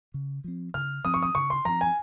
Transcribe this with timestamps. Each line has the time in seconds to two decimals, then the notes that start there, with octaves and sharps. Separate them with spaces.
0.14 C#3
0.44 F3 C4
0.74 C#3 F6
1.04 F3 C4 D#6
1.14 C#6
1.23 D#6
1.35 C#3 C#6
1.50 C6
1.65 F3 C4 A#5
1.81 G#5